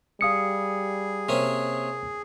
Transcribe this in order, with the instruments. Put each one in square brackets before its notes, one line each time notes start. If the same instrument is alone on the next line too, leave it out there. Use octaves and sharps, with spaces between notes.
[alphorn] G3 [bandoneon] G#4 [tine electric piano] F5 D#6 C#7
[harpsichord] C3 A#3 C#4